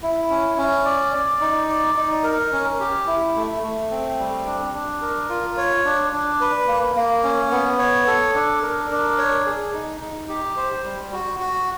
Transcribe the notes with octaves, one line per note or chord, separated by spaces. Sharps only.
E4
C#4
C#4
D5
D5
D#4
D5
D#4
A#4
C#4
G4
E4
A3
A3
C4
G3
D4
D4
A#4
F4
C#5
D4
D4
B4
A#3
A#3
C#4
B3
C#5
A4
D4
A#4
D4
C#5
G#4
D#4
D#4
G4
C5
G3
F#4
F#4